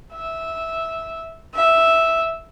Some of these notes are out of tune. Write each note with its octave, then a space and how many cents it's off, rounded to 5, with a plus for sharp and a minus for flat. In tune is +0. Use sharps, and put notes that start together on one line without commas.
E5 -10
E5 -5